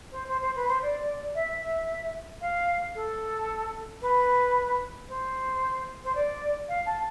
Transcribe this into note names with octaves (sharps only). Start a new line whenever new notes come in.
C5
C5
C5
B4
C5
D5
E5
F5
A4
B4
C5
C5
D5
F5
A5